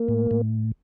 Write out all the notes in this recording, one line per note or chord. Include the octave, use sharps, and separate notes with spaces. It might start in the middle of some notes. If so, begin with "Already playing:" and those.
Already playing: A#3
A2
A2